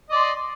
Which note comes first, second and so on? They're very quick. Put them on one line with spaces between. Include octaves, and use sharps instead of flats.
D#5 D5 C6